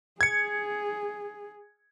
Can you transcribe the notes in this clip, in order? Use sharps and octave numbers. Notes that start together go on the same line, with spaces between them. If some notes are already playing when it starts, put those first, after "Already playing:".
G#4 G#6 C#7